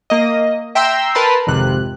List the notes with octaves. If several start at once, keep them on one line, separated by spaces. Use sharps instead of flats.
A#3 D#5
E5 G5 A#5 C6 E6
A#4 B4 A5 B5 C6
G#1 F2 C3 F#6